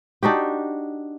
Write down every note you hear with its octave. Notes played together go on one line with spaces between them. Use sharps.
D4 D#4 F#4 G4